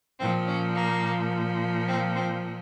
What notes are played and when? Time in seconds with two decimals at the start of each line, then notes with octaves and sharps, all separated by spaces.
0.19 A#2 F3 C4
0.47 C#4
0.76 A#3
1.87 C4
2.15 C4